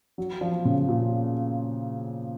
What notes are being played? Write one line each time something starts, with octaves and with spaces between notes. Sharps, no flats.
F#3
F3
C#3
A#2